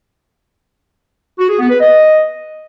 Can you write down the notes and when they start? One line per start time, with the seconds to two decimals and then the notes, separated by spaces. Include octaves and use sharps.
1.39 F#4
1.49 G#4
1.59 B3
1.70 B4
1.80 D#5